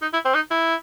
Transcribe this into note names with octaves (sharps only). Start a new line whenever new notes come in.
D#4
E4
C4
D#4
E4